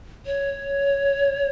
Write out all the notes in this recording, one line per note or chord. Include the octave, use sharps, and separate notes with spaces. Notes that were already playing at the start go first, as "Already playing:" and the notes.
C#5